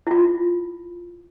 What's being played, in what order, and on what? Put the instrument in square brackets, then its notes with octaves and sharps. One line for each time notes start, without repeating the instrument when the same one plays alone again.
[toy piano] E4 F4